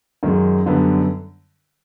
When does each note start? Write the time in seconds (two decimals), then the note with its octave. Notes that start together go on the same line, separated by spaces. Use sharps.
0.23 F#2 D#3 G#3
0.66 F#2 D3 G3 B3